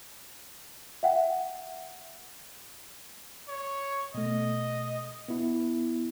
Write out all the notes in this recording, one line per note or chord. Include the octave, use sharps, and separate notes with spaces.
E5 F#5 G5
C#5
B2 A3 D#5
B3 E4